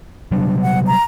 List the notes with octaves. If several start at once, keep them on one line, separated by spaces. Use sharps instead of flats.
C3 F#3 G3 D4
F#5
A#5